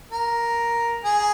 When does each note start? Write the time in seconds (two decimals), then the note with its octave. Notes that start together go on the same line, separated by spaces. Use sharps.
0.12 A#4
1.05 G#4